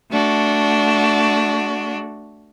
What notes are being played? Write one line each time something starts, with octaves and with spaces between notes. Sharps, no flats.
A3 D4 F#4